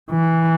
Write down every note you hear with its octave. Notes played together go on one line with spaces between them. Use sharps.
E3